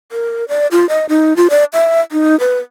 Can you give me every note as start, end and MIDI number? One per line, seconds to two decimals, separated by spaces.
0.12 0.45 70
0.48 0.67 74
0.71 0.88 65
0.89 1.06 75
1.09 1.36 63
1.37 1.48 65
1.50 1.64 74
1.73 2.00 76
2.12 2.38 63
2.40 2.59 71